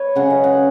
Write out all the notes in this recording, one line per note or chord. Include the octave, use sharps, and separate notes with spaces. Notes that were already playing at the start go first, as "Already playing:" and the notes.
Already playing: B4 C#5
C#3 F#3 C#4 F#5
D#5
F#5